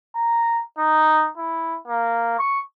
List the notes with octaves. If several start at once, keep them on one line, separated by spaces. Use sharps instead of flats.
A#5
D#4
E4
A#3
C#6